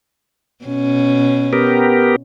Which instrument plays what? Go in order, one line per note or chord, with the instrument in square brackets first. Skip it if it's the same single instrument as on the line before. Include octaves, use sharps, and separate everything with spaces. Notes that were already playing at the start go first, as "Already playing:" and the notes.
[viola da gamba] B2 C#4
[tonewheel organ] B3 G4 A#4